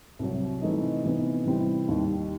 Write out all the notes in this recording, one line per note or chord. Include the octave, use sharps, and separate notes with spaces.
C2 C3 F#3
C3 E3 A3 D#4
C3 E3 B3 D#4
C3 E3 G3 C4 E4
D#2 D#3 G3